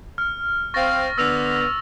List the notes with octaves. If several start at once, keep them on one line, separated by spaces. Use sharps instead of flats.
F6
C4 F5 C#6 A6 A#6
D3 B3 E6 A#6 F7